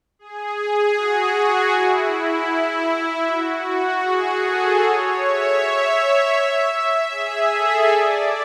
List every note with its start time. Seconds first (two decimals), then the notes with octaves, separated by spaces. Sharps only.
0.19 G#4
0.96 F#4
1.73 E4
3.26 F#4
4.03 G#4
4.42 A4
4.81 C#5
5.19 E5
7.11 G#4
7.50 A4
7.88 D5